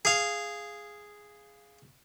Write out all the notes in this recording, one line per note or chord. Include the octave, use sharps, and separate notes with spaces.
G#4 F5